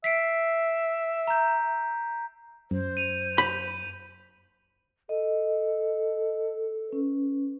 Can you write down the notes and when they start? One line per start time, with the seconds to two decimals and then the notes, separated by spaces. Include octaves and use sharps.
0.04 E5 B6 C7 D7
1.27 A#5 G6
2.71 F#2 C5
2.97 D#7 F7
3.38 B5 G6
5.09 A4 D#5
6.89 C#4 B4